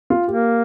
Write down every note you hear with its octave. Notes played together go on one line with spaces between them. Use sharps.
F4
A#3 G4